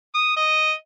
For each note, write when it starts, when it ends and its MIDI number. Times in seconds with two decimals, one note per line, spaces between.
0.15 0.37 87
0.37 0.73 75